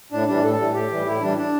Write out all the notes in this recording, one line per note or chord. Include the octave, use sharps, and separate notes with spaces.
A2 D4
E3 G3 D4
A2 A4
E3 G3
A2 G4
E3 G3
A2 E4
E3 G3 D4
D4